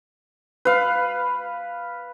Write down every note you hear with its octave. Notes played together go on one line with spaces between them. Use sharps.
B4 F5